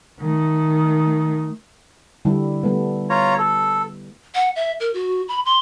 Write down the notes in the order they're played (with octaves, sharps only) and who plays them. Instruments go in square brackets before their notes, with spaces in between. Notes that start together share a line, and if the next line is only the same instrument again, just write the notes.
[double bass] D#3 A3
[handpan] D3 G3 E4
G3 A3 B3
[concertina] F4 C#5 A#5
A4
[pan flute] F#5
E5
A#4
F#4
B5
C6